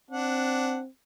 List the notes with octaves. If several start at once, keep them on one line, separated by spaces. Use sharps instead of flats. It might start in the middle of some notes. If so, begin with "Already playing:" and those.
C4 D4 F#5